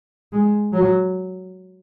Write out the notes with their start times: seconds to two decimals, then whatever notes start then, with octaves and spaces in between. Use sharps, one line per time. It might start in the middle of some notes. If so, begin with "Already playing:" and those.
0.32 G#3
0.73 F#3